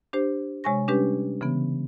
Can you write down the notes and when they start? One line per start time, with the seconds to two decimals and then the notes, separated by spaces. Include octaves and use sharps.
0.13 D4 G4 C5
0.64 C3 G#3 C#5 G#5 C#6 A#6
0.88 G3 C#4 D4 G4 B4
1.41 C#3 E3 B3